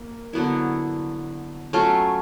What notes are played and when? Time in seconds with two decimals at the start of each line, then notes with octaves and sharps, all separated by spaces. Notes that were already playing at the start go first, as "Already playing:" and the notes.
Already playing: A#3
0.33 D3 F#3 B3 E4
1.73 F#3 A3 C#4 F4